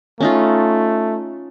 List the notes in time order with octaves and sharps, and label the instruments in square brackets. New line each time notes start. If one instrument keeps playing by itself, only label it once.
[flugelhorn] A3 [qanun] C#4 D#4 F4